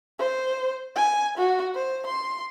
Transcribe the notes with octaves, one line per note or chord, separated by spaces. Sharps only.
C5
G#5
F#4
C5
C6